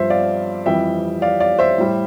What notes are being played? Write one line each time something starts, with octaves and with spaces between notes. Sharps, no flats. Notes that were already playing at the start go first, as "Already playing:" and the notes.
Already playing: G2 F3 C5 E5
D5 F5
F2 E3 G3 E5 G5
D5 F5
D5 F5
C5 E5
A2 G3